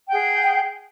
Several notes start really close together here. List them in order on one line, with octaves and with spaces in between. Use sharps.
G5 F#5 G#4